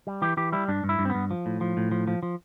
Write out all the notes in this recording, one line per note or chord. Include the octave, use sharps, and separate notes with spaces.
G3
E3 G4
E3 G4
G3 E4
G2 D4
G2
E4
G2
C4
G2 B3
F3
A2
F3
A2
F3
F3
F3